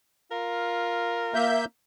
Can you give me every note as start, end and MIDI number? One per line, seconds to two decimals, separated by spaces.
0.31 1.54 65
0.31 1.63 70
1.34 1.65 58
1.34 1.65 76
1.34 1.65 91